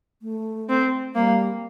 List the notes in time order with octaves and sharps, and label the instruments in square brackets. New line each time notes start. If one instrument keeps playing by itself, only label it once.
[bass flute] A3
[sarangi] C4
[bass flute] G3 [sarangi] A#3